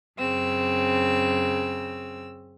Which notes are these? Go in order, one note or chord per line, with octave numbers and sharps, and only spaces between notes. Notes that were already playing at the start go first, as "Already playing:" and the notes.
F#2 C#3 C4 E6